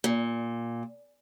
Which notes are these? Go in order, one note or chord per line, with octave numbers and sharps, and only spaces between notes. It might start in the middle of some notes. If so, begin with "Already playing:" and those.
A#2